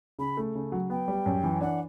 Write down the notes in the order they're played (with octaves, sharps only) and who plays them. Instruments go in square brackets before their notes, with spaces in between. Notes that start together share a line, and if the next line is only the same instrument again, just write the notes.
[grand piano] C#3 [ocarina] B5
[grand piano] A3
C#3
F#3
[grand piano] B3 [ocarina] G5
[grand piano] G3
F#2
E3
[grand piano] D4 [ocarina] F#5